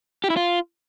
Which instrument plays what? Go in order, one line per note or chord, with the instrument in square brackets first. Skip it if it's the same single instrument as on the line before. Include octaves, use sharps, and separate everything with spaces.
[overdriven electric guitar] G4
E4
F4